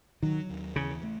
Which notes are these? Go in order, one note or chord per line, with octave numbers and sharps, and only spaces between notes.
D#3 F#3
D#2
C#3 E3
A3